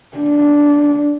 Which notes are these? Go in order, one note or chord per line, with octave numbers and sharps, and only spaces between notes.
D4